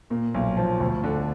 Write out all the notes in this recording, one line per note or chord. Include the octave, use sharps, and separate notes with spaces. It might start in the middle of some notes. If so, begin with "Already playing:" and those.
A#2 A#3
B1
F3
D2
D3